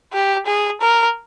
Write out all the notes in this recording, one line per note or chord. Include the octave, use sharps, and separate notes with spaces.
G4
G#4
A#4